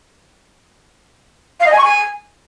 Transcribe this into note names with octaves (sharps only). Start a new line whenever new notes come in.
F5
D#5
G#5
C#6
G#5